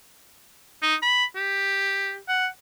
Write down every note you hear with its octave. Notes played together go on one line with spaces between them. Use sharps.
D#4
B5
G4
F#5